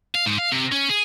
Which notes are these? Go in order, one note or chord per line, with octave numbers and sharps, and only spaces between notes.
F5
G#2
F5
C3
C#4
G#4